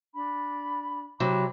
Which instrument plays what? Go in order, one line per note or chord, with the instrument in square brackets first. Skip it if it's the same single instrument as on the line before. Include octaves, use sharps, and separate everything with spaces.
[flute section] D4 B5
[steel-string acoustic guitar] C3 F#3 [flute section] B5 D6 F#6